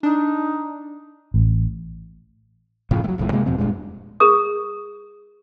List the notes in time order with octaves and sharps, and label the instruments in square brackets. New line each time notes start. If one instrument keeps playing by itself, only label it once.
[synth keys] D4 [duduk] D#4
[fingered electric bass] A1
F#1 A2 C#3 F3
F#3 A3
D#1 C#2 F#2 A2
C3 G#3 A#3
E2 B2 F3 C4
F1 G2 A#2 G#3
[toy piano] G#4 A#4 D#6